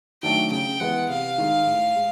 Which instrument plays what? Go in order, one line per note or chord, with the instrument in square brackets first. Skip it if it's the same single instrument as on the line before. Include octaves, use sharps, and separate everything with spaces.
[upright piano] D#3 F#3 A3 D4 [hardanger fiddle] G5
[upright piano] C#3 [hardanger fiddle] G5
[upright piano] E3 G#3 B3 [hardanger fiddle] F#5
[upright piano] C3 [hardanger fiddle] F5
[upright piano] D#3 G#3
A2
G#3